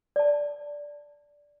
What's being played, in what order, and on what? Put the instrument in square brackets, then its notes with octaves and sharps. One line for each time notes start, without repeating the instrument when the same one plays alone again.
[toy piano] D5 A5